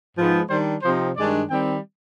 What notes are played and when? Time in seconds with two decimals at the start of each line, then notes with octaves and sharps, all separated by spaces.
0.16 G#2 F3 B3
0.49 D#3 G3 D4 C5
0.83 C3 F3 C4 D#4 C5
1.17 G2 D#3 G#3 D4 D5
1.50 D#3 G3 C4 G5